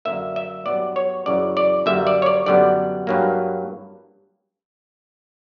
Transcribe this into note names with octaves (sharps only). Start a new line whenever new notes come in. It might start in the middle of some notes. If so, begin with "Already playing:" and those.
F#2 D3 A#3 E5
E5
G2 F#3 B3 D5
C#5
F#2 C#3 E3 D5
D5
F#2 D3 G3 A#3 E5
D5
C#5
D5
F#2 D3 G3 B3 D5
G2 F#3 A#3